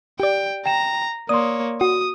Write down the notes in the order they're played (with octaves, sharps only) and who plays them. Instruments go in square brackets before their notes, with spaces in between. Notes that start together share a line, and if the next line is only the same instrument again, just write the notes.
[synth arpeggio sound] G4 D5 [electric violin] G5
[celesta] G5 E7 [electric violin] A#5
[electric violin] A#3 C#5 [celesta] D5 C6 [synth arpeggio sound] D#6
[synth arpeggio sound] F#4 [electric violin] D#6